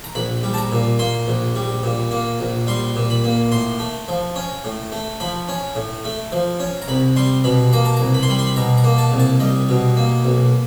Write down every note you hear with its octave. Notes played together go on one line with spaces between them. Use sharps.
A#5
A#1 B5
G3
A5
A#5
A#2
A#3 C6
A#1
G3
A#2
A#3
A#1
G3 C6
A#2
B5
A#3
A2 C6
A3
F3
C#4
A2
A3
F3 B5
C#4
A2
A3
F3
C#4
A#5
C2 B5
G3 C6
B2 B5
A#3 A#5
A5
C2 A#5
B5
C6
G3 B5
C6
B5
B2 A#5
A#5
A#3
A5
C2
A5
G3 D#5
B2
A#3
B1